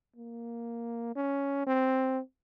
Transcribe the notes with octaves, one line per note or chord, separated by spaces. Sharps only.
A#3
C#4
C4